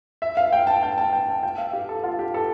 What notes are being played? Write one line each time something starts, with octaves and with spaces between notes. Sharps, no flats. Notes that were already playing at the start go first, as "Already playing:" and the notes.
E5
F5
G5
A5
G5
A5
G5
A5
G5
F5
G4
A4
F4
G4
A4